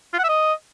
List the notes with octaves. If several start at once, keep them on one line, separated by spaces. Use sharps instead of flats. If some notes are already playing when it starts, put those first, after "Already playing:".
F4
F#5
E5
D#5